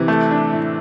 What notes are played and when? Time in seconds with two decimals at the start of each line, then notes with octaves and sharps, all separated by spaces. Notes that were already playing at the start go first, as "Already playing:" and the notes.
Already playing: C3 E3
0.08 A3
0.31 D4
0.53 A2